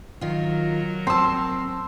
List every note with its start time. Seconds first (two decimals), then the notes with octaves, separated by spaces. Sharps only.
0.21 D#3 F#3 F4 A#4
1.07 C4 A5 C6 E6